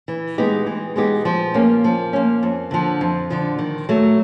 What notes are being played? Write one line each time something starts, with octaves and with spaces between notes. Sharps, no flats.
E3
G#3 B3 D#4 G4
E3
G#3 B3 D#4 G4
F3
A#3 C#4
F3
A#3 C#4
F2
D3 F3
F2
D3 F3
D#3
F#3 A3